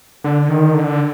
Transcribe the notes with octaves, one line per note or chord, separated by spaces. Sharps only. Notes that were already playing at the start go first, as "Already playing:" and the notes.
D3
D#3
D3